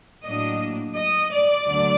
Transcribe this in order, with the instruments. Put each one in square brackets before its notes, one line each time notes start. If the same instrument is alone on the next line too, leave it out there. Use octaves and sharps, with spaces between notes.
[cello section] A2 F#3 A#3 D4 D#5
D#5
D5
D2 D3 F#3